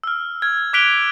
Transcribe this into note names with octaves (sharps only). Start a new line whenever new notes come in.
E6 F6
F6 G#6
D6 F#6 B6 D7 F7 G7